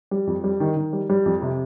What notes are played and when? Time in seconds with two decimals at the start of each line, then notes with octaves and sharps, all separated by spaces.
0.11 G3
0.27 F2
0.44 G3
0.60 D#3
0.76 D#3
0.93 G3
1.10 G3
1.26 F2
1.42 C3